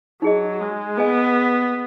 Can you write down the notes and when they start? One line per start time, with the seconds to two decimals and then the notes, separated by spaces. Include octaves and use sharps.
0.22 F#3 D#4 G#4 D#5
0.61 G#3
0.98 B3 G#4 B4 D#5 G#5